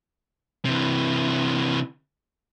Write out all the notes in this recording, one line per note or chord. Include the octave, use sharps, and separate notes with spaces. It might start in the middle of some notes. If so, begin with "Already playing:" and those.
C3 E3